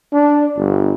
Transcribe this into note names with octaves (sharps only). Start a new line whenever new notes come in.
D4
G1